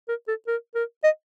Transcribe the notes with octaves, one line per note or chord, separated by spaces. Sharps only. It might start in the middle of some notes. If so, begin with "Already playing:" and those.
A#4
A4
A#4
A#4
D#5